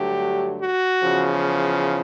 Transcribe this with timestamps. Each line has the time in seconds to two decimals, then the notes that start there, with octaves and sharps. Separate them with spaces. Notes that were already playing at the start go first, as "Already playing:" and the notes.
Already playing: G2 D3 F#3 A3 G4
0.60 F#4
1.01 E2 C#3 F3